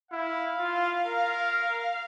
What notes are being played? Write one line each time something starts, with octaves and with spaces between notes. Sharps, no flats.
E4 F5
F4
A#4